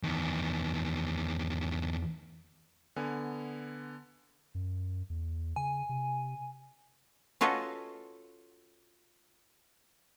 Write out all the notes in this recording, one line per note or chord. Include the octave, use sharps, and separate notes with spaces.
E2 D#3
D3 B3 G#5
F#2
E2
C#3 G#5
C3
C#4 F4 F#4 A4 B4 D#5